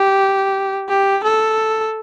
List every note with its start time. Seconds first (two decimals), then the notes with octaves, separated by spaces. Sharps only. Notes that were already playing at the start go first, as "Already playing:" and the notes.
Already playing: G4
0.89 G4
1.23 A4